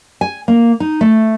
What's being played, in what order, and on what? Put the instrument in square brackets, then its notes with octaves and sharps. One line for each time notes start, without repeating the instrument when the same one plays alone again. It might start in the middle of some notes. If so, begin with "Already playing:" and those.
[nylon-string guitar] G#5
A#3
D#4
A3